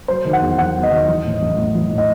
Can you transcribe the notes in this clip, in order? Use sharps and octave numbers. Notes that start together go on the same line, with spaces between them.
F#3 C5
D#3
F#5
E2
E2 F#5
F#3
D#5
D#3
E3
A2
A1
A1
E3
A2
D#5